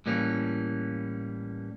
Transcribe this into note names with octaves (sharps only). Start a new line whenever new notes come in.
A2 E3 G3 A#3 C#4